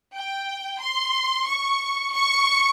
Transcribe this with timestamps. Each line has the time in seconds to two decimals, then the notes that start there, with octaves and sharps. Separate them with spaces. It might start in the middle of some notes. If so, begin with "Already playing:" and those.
0.15 G5
0.81 C6
1.47 C#6
2.14 C#6